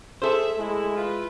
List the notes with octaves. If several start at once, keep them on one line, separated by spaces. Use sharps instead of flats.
G#4 A4 C5 E5
G#3 A3 E4
E4 F4 B4